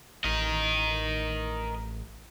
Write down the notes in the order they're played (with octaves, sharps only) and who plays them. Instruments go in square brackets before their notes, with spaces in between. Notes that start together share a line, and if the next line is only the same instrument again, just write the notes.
[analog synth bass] A1 [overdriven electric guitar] A#4 D#5